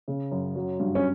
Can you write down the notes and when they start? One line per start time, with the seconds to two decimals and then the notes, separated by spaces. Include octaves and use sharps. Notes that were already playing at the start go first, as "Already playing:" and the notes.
0.08 C#3
0.31 F#2
0.56 F#3
0.80 G2
0.95 C#4